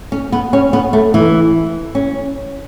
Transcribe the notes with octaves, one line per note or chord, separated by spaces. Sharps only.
C#4
B3
C#4
B3
A3
E3
C#4